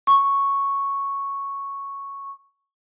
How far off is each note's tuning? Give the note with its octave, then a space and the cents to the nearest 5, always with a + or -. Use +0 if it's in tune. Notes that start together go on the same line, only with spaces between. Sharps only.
C#6 -5